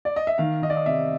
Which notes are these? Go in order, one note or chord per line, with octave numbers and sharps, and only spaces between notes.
D5
D#5
E5
D#3 F5
D#3 D#5
D5
D#5
C3 E5